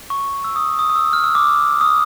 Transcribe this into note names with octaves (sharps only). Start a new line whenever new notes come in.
C#6
E6
D#6
D#6
D#6
E6
F6
E6
D6
D#6